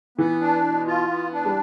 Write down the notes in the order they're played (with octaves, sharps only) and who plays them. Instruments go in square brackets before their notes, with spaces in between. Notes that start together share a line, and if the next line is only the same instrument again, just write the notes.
[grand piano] E3 [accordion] B3
[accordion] D4
B2
F4
B3
D4
[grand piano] G3